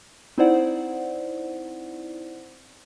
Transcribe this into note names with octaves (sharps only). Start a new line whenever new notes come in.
C4 D#4 E4 C5 D5 F#5